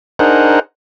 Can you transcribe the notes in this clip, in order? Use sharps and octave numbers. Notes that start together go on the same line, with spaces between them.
D4 D#4 G#4 A#4 C5 F#5